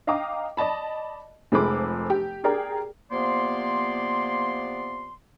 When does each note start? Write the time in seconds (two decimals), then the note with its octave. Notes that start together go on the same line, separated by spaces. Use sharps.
0.07 D#5 F5 G5 A#5 D6 D#6
0.57 D5 D#5 A5 B5
1.52 F1 F3 G#3 A4 B5 D6
2.10 G4
2.44 G4 G#4 A#4 D5 G5 A#5
3.11 C3 F3 A#3 B3 D5 C6